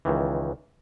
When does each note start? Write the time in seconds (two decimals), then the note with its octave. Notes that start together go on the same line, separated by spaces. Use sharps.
0.05 C#2 D#3 E3